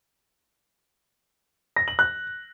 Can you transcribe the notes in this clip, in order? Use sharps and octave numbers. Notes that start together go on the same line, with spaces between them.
A#6
F#7
F#6